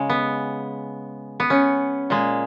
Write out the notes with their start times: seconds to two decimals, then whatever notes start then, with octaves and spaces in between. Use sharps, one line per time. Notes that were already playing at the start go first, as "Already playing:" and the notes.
Already playing: C#3 G#3
0.10 B3
1.40 B3
1.50 C#4
2.10 A#2 G#3